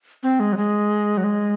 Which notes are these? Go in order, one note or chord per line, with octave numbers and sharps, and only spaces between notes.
C4
G#3
F#3
G#3
F#3
G#3